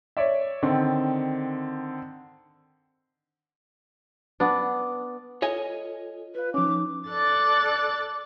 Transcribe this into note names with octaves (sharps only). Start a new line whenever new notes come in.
C#5 D5 E5
D3 D#3 C4
B3 D4
F4 A4 C#5 D#5 G#5
F4 B4 F5
F3 C#4 D#4 D6
A4 D5 F#6 A6